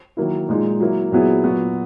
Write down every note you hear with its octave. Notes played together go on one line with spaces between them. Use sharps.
D#3 F#3 A#3 E4
A#2 G#3 D#4 G#4
F#3 A#3 E4
A#2 F#3 B3 E4 G#4
A#2 F#3 B3 F#4